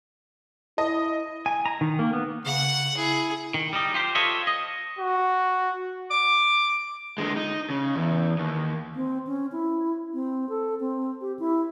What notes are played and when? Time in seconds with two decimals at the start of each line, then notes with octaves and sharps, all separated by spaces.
0.78 E4 D#5
1.46 G#5
1.66 A#5
1.81 D#3
1.99 A#3
2.13 B3
2.45 C#3 F#5
2.97 E4 G#4
3.54 D#3
3.73 G3 D#4
3.94 F4 G4 C5
4.15 F4 A4 C5 C#5 D#5 E5
4.47 D#5
4.99 F#4
6.11 D6
7.18 D3 G#3
7.37 D#4
7.70 C#3
7.96 E2
8.39 D#2
8.95 C4
9.27 C#4
9.52 E4
10.14 C4
10.49 A4
10.80 C4
11.21 G4
11.39 E4